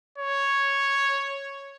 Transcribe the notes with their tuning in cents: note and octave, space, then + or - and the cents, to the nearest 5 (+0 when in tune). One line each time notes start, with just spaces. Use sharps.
C#5 -5